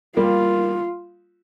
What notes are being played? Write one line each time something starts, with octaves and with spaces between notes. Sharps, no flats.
G3 A#3 F4